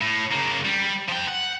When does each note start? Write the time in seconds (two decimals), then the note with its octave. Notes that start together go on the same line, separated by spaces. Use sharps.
0.01 A2
0.31 C#3 A#3
0.65 G3
1.09 F3 G5
1.28 F#5